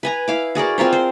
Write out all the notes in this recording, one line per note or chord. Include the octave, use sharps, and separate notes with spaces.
B4 G#5 A#5
E4 F5 D6
F#4 G#4 A#4 D5
C4 F4 A#4 C5
C5